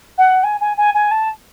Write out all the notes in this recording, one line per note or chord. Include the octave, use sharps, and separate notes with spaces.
F#5
G#5
G#5
G#5
G#5
A5